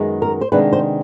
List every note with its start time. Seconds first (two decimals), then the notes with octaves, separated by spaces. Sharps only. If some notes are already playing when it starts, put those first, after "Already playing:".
Already playing: F#2 D#3 G#3 B3 D#4
0.22 A#4
0.41 C5
0.52 C3 D#3 G#3 B3 D4 B4
0.73 C5